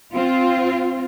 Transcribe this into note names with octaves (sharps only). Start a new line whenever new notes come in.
C4 F4